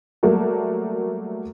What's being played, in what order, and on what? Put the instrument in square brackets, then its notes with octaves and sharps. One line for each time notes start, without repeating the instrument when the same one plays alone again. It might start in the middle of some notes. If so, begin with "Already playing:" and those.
[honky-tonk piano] F#3 G3 A3 A#3